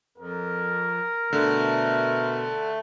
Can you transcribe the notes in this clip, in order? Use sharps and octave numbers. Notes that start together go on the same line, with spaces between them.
F2 A#4
B2 D3 A3